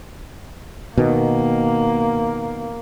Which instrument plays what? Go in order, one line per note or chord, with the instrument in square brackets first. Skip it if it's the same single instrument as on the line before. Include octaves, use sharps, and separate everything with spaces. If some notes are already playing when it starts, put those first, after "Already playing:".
[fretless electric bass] B2 D#3 [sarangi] A#3